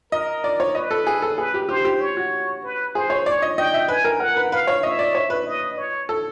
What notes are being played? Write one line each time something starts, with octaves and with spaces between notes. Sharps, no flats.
A#4 D#5
D5
C#5
B4 D#5
A4
G#4
A4
G#4 B4
G4
G4 C5
G4
C#5
F#4
B4
G#4 C5
C#5
C#5 D5
D#5
D#5 G5
E5
B4 G#5
A#4
A#4 F#5
B4
B4 F5
C#5
D#5 E5
D5
C#5
B4
D#5
C#5
A4